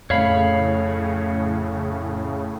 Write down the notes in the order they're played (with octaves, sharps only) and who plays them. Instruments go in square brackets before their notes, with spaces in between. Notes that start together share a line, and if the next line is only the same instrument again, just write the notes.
[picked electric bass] F2 A3 [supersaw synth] A2 C#3 [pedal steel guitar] C#5 F5 B5